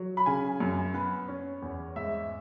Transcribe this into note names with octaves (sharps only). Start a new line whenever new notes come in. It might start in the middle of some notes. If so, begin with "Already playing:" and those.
Already playing: F#3
B5
C#3 G#5
F#2
B3
C#4
E2
G#2 E5